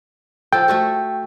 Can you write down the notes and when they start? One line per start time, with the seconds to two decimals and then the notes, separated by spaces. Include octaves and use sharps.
0.53 F3 A4 G5
0.68 A3 F#4 A4